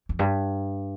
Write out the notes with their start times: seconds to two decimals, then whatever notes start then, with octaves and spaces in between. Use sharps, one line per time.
0.09 F2
0.19 G2